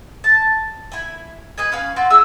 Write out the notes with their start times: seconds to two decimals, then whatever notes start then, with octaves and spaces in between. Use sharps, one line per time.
0.24 A5
0.92 E4 G#5
1.58 G#4 B4 D#5 G#5
1.72 C#4 B4 F5 G#5
1.96 C4 F4 F#4
2.10 E4 F4 G#4 E6